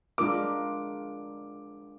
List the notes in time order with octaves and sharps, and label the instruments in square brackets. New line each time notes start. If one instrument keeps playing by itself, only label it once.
[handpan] G#3 D4 F4 A#4 [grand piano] D6